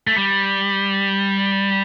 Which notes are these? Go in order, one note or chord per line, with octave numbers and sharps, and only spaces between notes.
A3
G3